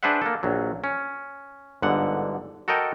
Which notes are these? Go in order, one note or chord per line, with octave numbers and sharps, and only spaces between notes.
D4 G#4 B4 C5 E5 F#5
A#3 A4
A#1 F#3
C#4
G1 G#2 D3 F#5
F#4 A4 A#4 D#5 G5